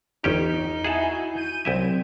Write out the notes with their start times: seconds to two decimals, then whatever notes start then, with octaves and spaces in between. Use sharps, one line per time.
0.24 G1 E2 C#4 D#4 G4
0.84 E4 F#4 G#4 F#5 G#5 A5
1.36 G6 D#7
1.65 C2 F#3 C4 E4 E5